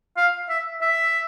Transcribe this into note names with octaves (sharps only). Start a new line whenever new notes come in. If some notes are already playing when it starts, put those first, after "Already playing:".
F5
E5
E5